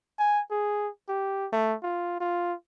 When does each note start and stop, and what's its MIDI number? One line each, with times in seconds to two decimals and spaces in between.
0.19 0.41 80
0.51 0.89 68
1.08 1.47 67
1.53 1.74 57
1.83 2.17 65
2.20 2.53 65